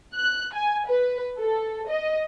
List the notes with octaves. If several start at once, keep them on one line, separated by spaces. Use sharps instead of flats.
F#6
G#5
B4
A4
D#5